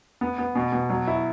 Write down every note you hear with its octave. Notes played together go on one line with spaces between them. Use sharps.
B3
B3
B2
B2
F#3
E4